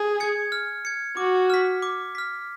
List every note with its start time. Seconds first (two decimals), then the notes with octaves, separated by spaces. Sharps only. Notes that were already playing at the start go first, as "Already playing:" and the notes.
Already playing: G#4
0.20 G#6 C#7
0.52 F6
0.85 G#6 C#7
1.17 F#4 D6
1.50 F6 B6
1.82 D6
2.15 F6 B6